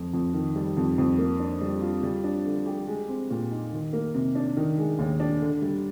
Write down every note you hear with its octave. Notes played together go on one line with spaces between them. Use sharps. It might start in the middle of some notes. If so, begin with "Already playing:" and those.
Already playing: F2 F3
F2
D#3
G3
F2
F2
A#3
D4
G3
F4
G3
D4
D3
G4
G#3
C4
A#2
D#4
D#3
A#3
C3
D4
D#3
G#3
D#2
D4
D3
G3